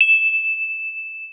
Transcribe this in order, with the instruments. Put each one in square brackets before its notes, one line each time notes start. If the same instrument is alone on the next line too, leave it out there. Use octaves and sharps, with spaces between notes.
[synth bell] E7